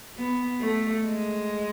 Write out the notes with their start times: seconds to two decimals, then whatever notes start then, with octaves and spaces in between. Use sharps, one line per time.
0.17 B3
0.60 A3
1.04 G#3